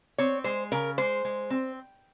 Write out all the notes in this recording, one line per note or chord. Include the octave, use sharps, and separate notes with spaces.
C4 C#5
G#3 C5
C#3 A#4
G#3 C5
G#3
C4